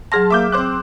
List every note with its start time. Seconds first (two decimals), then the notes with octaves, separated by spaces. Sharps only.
0.12 F#3 G#4 A5 C6 F6 A#6
0.30 A#3 E5 D6 G6
0.52 C4 C5 D6 F#6